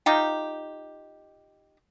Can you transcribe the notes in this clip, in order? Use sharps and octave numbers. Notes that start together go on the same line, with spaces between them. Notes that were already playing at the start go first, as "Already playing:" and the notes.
D#4 F4 G4